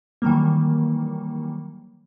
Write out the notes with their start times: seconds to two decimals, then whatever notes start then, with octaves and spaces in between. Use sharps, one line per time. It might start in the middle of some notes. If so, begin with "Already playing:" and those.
0.22 D#3 E3 F#3 G3 A#3